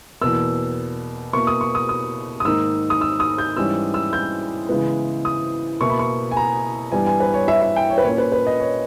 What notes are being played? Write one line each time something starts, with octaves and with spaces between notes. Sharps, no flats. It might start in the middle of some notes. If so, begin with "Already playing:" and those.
E2 B2 A#3 E6
B2 A#3 E4 C#6
D#6
C#6
D#6
D#6
D#6
G#2 D#3 A#3 D#4 E6
D#6
E6
D#6
G6
G#2 E3 G3 C#4 E6
E6
G6
C#3 E3 G#3 B3
D#6
B2 A#3 E4 C#6
B5
C#6
G#5
A#5
G2 E3 G3 B3 G#5
G#5
B4
C#5
E5
E5
G5
C#5
B4
A#2 A#3 C#4 C#5
B4
B4
D#5
C#5